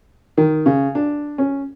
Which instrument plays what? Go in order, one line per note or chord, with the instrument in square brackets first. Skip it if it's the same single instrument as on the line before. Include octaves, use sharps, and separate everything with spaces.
[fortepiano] D#3
C#3
D4
C#4